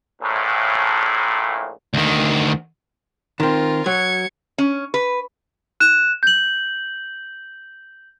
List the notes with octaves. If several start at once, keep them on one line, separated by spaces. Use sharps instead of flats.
A#1 A2
D2 D#3
D#3 C4 F4 A#4
F#3 G#6 C#7
C#4
B4
F#6 E7
G6 F#7